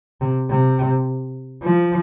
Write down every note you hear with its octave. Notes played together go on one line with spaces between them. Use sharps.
C3
C3
F3